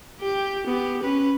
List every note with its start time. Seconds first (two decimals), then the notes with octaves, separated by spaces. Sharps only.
0.21 G4 G5
0.67 B3 G4
1.03 C#4 B4